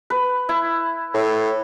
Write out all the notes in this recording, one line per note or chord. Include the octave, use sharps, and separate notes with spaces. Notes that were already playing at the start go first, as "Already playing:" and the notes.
B4
E4
A2